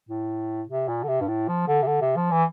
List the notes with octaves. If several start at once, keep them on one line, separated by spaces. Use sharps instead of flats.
A2
C3
A#2
D3
C3
G2
A2
F3
D3
C3
D3
C3
F3
E3